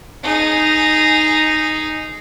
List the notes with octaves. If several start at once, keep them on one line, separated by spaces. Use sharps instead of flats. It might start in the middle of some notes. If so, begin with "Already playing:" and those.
D#4 G#4